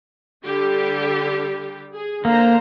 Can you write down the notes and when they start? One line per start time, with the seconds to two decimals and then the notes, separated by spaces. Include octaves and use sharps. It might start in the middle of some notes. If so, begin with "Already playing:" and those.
0.44 D3 G3 G4
1.95 G#4
2.25 D3 A#3 C5 A#5